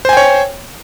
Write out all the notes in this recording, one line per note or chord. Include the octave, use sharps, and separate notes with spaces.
C5 C#5 G5 G#5